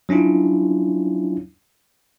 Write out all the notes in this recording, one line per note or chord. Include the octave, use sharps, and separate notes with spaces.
F#3 C#4 D4 E4 F4